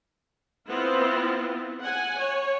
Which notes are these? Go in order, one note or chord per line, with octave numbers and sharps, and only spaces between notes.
B3 C4 E4 F4
F#5 G#5
C#5